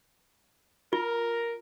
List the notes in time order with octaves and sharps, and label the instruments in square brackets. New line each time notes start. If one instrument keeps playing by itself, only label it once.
[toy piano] F4 [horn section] A#4